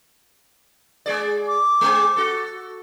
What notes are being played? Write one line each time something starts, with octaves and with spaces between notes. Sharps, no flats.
G#3 G#4 D5
D6
G#3 C4 G#4
F#4 A4